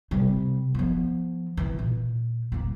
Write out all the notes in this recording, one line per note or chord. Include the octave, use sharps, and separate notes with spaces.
C3 G3
F3 B3
E3
A#2
D#1 A#3